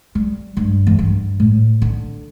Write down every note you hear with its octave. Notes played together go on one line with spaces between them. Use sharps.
G3
G2
E2
G2
A2
D3